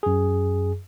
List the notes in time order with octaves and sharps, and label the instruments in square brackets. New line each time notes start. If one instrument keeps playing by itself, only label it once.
[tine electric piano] F#2 G#4